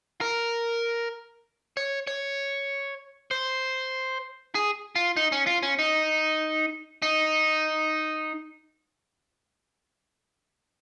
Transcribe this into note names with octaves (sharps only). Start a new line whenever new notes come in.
A#4
C#5
C#5
C5
G#4
F4
D#4
C#4
F4
C#4
D#4
D#4